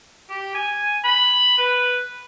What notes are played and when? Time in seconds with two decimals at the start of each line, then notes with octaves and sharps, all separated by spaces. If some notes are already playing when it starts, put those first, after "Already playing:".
0.29 G4
0.55 G#5
1.04 B5
1.58 B4